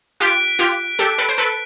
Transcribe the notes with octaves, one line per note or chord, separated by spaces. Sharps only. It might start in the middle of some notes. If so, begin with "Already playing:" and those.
F4 G4 F#6 B6 D7
F4 G4
G4 A4
A4 B4
C5
A4 B4